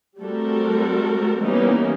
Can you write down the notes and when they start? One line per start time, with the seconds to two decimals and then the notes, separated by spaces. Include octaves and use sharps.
0.20 G3 A3 C4 F#4 A4 A#4
1.41 E3 G3 A#3 B3 C#4 D#4